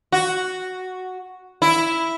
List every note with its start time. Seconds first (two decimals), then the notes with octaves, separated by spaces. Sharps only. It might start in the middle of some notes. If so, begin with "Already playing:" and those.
0.12 F#4
1.62 E4